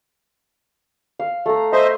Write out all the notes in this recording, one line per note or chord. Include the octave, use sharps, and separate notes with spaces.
F5
A3 A#5
C5 D#5 E5 C6